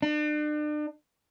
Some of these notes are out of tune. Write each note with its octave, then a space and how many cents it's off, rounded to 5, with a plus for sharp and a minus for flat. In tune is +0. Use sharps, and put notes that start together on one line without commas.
D4 +40